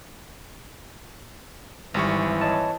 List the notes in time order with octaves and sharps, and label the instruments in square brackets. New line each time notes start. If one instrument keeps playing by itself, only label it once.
[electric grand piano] G#1 G3 C#6 [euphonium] E3
[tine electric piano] C#5 D#5 A5